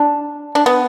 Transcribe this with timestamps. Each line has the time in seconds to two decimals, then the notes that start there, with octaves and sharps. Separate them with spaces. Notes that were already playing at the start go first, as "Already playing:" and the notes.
Already playing: D4
0.55 D4
0.66 B3